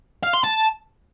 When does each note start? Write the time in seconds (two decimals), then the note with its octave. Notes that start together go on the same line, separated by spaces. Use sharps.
0.23 F5
0.34 C6
0.44 A5